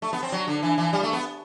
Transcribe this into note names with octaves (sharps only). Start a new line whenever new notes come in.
A3
B3
C4
F#3
D3
E3
E3
G3
A3
B3